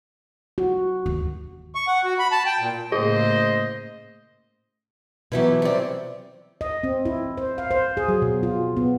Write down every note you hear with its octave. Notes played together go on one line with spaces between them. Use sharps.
F#4
D#2
C#6
F#5
F#4
B5
A5
G5
A#2
A2 C#3 A#3 G#4 C5 D#5
B2 E3 F#3 B3 E4 G4
C3 G3
D#5
C4
E4
C5
F5
C5
G#4
F#3
B2
F4
B3